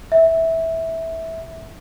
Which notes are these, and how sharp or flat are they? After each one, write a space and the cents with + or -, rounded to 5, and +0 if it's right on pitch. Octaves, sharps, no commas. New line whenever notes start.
E5 -15